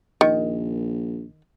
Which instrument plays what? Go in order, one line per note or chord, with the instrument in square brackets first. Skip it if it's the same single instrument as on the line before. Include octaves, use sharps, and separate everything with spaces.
[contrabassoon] A#1 [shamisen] D#3